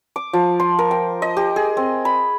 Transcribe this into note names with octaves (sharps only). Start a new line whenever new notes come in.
D6
F3
C6
A#4
G5
D#5
G4
G#4
C4
B5